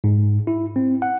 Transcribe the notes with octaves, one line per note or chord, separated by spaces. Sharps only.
G#2
E4
C4
F#5